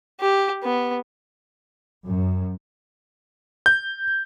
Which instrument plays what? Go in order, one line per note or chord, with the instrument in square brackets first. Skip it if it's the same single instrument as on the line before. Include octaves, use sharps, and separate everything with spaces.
[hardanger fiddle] G4
B3
[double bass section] F#2
[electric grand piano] G6